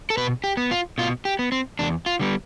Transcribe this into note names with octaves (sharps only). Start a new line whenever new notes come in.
A4
B2 B4
G4
B3
F4
B2 F4
G4
B3
C4
E2 D4
F4
D3 G3 B3